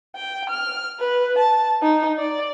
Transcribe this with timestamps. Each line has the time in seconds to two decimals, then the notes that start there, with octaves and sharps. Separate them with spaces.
0.16 G5
0.50 F6
1.00 B4
1.39 A5
1.82 D#4
2.18 D5